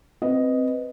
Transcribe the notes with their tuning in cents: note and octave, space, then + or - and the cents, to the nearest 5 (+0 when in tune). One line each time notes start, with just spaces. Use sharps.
C4 +0 B4 +0 D#5 +0